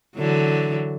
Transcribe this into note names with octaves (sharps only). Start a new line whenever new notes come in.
D3 E3 F#3